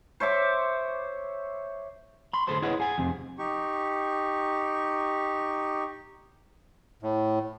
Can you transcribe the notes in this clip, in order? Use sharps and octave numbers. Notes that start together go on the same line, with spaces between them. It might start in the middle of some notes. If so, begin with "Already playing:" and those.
C5 C#5 E5 D6
B5 C6
D2 G#4 A4 C5 C6
E4 G#4 B4 C#5 D#5 F#5
G#4 F#5 G#5
F2 C3
D#4 G4 C#6
A2